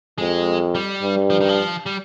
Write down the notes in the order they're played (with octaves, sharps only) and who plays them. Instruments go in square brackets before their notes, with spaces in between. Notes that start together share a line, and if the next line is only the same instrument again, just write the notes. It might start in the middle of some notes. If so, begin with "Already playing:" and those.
[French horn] F2 [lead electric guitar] G#3
[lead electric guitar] G3
[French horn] G2
[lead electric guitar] F3
D#3
F3
G3